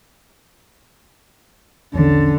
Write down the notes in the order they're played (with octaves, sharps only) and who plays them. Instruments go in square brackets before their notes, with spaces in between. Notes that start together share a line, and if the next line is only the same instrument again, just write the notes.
[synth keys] A#1 E2 C#4 [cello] D3